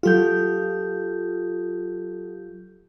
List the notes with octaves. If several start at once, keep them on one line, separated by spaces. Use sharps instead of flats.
F#3 F4 G4 A4 G6